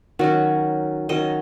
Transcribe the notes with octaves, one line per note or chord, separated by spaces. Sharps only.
D#3 F#3 C#4 F#4
D#3 F#3 C#4 D#5